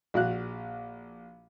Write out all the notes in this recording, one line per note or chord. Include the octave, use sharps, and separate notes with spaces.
A#1 F#4 F5 F#6